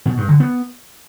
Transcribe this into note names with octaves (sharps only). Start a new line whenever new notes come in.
B2
G2
D3
B3